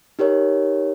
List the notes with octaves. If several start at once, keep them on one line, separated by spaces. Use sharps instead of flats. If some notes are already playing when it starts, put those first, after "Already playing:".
D#4 G4 A#4 C#5